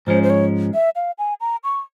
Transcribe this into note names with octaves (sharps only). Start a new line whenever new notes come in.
G#2 F3 G#3 C#4 C5
C5
C#5
E5
F5
G#5
A#5
C#6